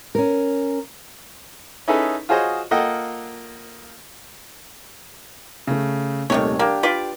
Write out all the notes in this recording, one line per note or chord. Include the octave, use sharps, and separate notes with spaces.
C#4 A#4
C#4 D#4 E4 G#4 A4 B4
F4 F#4 G#4 C5 C#5 D#5
A#3 F4 A4 D#5 F#5 G5
C#3 A3
D#1 C3 D#3 A3 B3 C#5
A#3 D4 G4 D6
F4 B4 D5